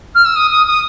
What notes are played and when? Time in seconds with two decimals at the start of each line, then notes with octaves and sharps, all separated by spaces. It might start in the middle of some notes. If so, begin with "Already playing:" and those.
0.15 F6
0.25 E6
0.36 D#6
0.50 D#6
0.67 D#6